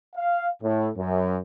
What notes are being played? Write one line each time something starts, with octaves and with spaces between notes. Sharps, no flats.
F5
A2
F#2